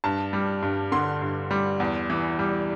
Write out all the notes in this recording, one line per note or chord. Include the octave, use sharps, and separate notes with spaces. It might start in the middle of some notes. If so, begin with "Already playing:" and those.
G2 A5
G3
G2
D3 C6
G2
G3
E2
E3
G3